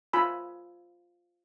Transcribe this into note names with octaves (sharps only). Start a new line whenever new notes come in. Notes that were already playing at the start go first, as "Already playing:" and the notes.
F4 G#5 B5 E6